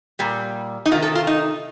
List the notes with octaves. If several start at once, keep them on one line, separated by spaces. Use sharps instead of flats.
A#2 G3
D#4
C3 D#3 A3 F4
A4
F4
D#4